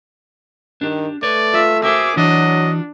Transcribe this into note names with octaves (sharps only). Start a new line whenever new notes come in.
D#3 D4 G4
A3 B4 C#5 D5
F4 E5
F#4 G#4 A#4 C5 E5 D6
E3 F#3 D4 F4 F#4 D#5